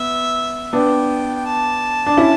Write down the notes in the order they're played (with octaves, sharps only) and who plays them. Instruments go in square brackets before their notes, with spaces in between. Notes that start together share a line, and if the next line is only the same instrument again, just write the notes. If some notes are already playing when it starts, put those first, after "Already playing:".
Already playing: [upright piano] B3 [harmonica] E5
[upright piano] B3 D4 [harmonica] G5
[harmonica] G5
A5
[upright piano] D4
C#4 E4